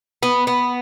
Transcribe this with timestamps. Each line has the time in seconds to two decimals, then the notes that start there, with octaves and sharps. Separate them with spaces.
0.23 B3
0.47 B3